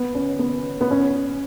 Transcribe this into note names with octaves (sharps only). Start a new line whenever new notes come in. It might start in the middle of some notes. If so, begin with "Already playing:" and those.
Already playing: B3
C#4
B3
B3
C#4